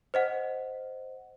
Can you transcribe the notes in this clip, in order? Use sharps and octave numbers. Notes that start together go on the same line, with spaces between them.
C5 D#5 F#5